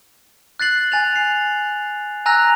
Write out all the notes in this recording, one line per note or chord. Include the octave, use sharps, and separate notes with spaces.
F#6 A6 C7 F#7
G#5 A6 F7
C7
G#5 A#5 E6 F#6 A#6 F7